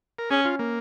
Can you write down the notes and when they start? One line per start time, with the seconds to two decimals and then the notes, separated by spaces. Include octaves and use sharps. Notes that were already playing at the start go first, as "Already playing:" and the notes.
0.19 A#4
0.30 C#4 G#4
0.45 F4
0.59 A#3